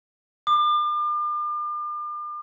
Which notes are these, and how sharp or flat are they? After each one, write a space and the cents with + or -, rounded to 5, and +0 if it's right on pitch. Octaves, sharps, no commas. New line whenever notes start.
D6 +40